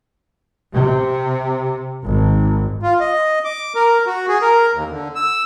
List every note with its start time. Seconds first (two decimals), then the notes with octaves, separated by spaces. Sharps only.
0.73 C3
2.03 G#1
2.83 F4
3.00 D#5
3.44 D6
3.75 A#4
4.07 F#4
4.29 G#4
4.42 A#4
4.74 D#2
4.91 D3
5.15 E6